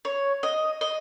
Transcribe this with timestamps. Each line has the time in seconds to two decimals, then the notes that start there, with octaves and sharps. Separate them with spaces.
0.05 C#5
0.43 D#5
0.81 D#5